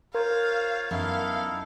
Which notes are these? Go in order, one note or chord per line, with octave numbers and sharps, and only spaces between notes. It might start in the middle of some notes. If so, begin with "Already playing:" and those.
F4 A#4 C5 C#5 F5
F#2 B3 D#4 E4 A4 F5